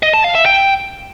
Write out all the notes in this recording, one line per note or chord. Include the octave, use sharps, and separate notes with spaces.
D#5
A5
F5
E5
G5